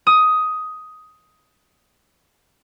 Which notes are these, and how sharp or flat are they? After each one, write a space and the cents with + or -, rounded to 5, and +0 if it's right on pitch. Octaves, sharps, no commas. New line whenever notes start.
D#6 +10